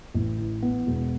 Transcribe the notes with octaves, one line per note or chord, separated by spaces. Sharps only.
A1
E3
B3
E1